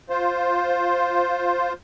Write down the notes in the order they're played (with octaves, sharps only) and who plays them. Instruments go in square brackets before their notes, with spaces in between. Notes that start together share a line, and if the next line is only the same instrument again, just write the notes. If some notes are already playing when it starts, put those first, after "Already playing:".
[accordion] F4 C5